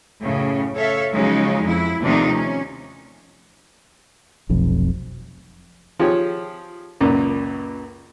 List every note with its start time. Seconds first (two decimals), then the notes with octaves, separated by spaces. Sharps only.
0.22 F#2 A2 C#3
0.75 A4 C#5 E5 F5
1.11 C#3 F3 F#3 G#3 C#4 D#4
1.64 F2 E4
2.02 D#2 C3 F3 A3 D4 D#4
2.33 C#4
4.49 F1 B1 F2
5.99 F3 F4 G4 G#4 C#5
7.01 C#2 F#2 A#2